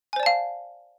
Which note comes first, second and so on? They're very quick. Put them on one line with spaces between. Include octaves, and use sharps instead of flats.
G#5 C5 D5 A5 F5